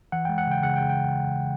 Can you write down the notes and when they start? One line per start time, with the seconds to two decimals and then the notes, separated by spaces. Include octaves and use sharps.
0.12 E3 F#5
0.25 G#3 G5
0.38 F#5
0.47 C#3 G5
0.63 C#3 F#5
0.76 C#3 G5
0.89 G5